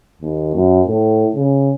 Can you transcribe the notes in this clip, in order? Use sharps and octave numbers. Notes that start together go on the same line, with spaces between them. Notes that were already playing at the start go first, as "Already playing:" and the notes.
D#2
F#2
A2
C#3